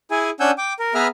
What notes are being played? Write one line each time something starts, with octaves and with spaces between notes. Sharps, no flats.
E4 G#4 G#5
C#4 D4 F#5 G#5 E6 G6
G5 D6
A#4
B3 G#4 B4 E5 A#5 F6